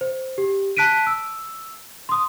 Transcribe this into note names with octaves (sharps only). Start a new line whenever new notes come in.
C5
G4
A5 F#6 B6 D7 D#7
E6
C6 D#6